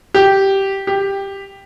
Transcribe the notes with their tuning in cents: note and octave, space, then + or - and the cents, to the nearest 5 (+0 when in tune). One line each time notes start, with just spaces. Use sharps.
G4 -10
G4 +5